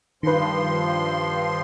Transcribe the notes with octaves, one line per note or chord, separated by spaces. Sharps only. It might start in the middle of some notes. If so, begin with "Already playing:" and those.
G2 D#3 F3 B4 C6